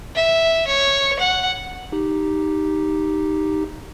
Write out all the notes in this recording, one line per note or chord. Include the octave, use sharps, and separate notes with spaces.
E5
C#5
F#5
D#4 G4